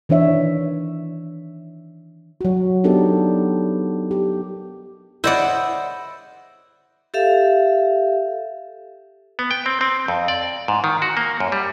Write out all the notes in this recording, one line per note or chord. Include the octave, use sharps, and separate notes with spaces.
D#3 E3 D4 C#5 E5
F#3 F#4
B3 D4 D#4 G4 A4 A#4
G4
E4 C5 D5 D#5 F#5
G4 A4 E5 F5
B3
G5
C4
C4
F2
D5
G#2
D#3
F#4
A#3
F#2
G3